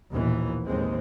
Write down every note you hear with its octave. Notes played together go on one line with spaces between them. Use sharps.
A#1 D#2 B2 E3
A1 D#2 G#3 C4